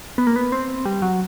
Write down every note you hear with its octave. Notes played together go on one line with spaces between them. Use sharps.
B3
A#3
B3
C4
G3
F#3